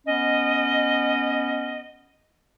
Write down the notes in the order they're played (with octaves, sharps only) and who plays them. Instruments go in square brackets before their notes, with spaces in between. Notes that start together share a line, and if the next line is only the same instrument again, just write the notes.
[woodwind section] B3 C#4 D#5